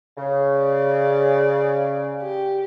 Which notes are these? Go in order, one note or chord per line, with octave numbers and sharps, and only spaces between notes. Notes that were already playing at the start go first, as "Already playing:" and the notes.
C#3
D5
G4